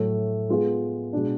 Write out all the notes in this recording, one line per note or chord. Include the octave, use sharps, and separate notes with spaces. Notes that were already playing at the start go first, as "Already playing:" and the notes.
Already playing: A2 F#3 A3
G#3 B3 F4 G#4
B2 G#3 D4